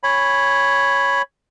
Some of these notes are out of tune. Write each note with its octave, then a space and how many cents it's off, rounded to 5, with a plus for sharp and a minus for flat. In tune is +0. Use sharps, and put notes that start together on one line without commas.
C#5 +0 G#5 -25 B5 +0